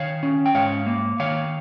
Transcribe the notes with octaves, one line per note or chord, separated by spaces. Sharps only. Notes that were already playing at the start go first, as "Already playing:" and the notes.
Already playing: D#3 C#5 F5
C#4
G5
G#2 C#5 F5
A#3
D#3 C#5 F5